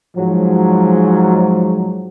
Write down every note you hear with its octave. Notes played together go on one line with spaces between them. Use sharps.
G#2 F3 F#3